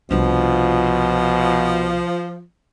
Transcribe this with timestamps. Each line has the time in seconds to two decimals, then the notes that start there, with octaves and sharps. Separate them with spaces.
0.11 C2 B2 F3 D4